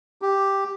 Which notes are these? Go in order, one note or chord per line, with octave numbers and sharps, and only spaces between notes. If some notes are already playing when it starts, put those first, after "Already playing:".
G4